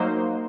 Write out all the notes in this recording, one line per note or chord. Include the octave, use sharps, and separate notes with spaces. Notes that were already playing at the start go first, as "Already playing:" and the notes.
Already playing: F#3 A#3 D#4 C5